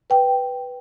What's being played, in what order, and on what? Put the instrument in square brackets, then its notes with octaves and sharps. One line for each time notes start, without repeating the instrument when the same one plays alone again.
[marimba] B4 G5